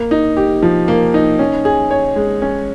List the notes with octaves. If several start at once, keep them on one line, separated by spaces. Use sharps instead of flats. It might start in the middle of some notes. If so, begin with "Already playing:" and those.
Already playing: A#3
D#4
G4
F3
A#3
D#4
C#4
G#4
C#5
G#3
C#4